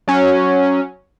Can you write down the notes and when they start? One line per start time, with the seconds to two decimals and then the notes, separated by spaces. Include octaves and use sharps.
0.08 F#3 C#4